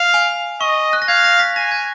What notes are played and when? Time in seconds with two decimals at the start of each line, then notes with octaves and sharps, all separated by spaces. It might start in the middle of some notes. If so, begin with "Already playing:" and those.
Already playing: F5
0.14 G#5
0.61 D#5 C#6
0.93 F#6
1.02 A#6
1.08 F5 G#6
1.24 A#6
1.39 B6
1.56 G#5 A#6
1.72 G#6